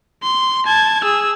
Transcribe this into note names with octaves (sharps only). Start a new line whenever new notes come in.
C6
A5 G#6
G#4 E6